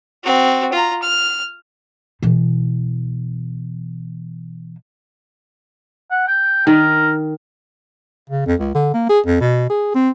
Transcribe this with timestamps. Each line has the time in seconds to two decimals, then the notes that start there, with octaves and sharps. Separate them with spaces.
0.24 C4 F#4
0.72 F4 A#5
1.02 F6
2.22 B2 E3
6.11 F#5
6.28 G5
6.67 D#3 A#4
8.30 C#3
8.47 F2
8.60 C#2
8.75 D3
8.94 A#3
9.09 G#4
9.26 F2
9.41 B2
9.70 G#4
9.95 C4